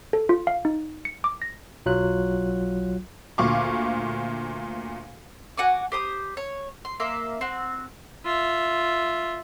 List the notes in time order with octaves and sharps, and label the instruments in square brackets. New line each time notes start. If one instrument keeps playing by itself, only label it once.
[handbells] A4
F4
F5
D#4
C#7
D6
A#6
[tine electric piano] B1 F#3 F4 F#6
[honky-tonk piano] D2 A#2 F5 C#6 D6
[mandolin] F#4 F#5 G#5 D6
G4 C5 D#6
C#5
C6
A#3 E5 F5 C6
C4 F#4
[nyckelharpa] F4 E5